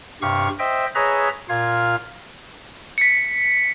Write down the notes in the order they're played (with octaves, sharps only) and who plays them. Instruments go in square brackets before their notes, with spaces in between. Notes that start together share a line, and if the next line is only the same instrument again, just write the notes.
[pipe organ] G2 C3 G4 F5 C#6
C5 D#5 E5 G5
G#4 B4 C#5 D#5 E5 A#5
A#2 F4 F5 G#6
[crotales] B6 C#7